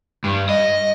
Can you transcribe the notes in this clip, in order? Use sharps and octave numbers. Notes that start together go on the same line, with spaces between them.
G2
D#5